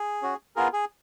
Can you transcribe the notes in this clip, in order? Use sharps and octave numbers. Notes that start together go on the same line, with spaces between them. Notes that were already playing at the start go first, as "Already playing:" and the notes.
Already playing: G#4
C#4 F#4
B3 F4 G#4 A#4
G#4